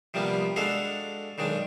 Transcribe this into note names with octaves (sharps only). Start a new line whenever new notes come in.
C3 F3 G3 A#3 B3
G#3 D4 F#4 A4 F5
B1 D#3 G#3 D4